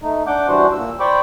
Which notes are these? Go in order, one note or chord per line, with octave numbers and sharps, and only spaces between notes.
A3 D#4
D4 F#5 D6 G6
E3 G3 D4 F#4 C5
A#2 E6
C5 D5 G5 B5 C#6 D6